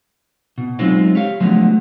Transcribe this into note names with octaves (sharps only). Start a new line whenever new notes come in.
B2
F#3 G#3 C4 C#4 D#4 F4
G4 C#5 F5
D3 F3 F#3 G#3 A3 B3